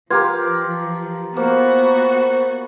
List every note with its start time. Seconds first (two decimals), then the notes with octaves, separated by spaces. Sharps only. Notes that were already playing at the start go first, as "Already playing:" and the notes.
0.10 F3 F4 G4 A#4 B4 C6 G#6
1.37 A#3 B3 F#4 C5